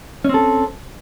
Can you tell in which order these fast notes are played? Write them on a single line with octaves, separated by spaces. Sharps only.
C#4 C4 A4